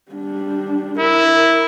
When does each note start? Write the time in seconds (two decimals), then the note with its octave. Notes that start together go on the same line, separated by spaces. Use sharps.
0.12 G3 D4
0.99 E4 A#4